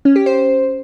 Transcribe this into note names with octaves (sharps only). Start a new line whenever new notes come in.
C#4
G4
C5